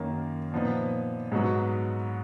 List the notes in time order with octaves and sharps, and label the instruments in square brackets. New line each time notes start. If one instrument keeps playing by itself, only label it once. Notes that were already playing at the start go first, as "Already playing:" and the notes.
Already playing: [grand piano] F#2 D#3 A#3
A#2 F3 B3 D#4
G#2 F#3 B3 D#4 F#4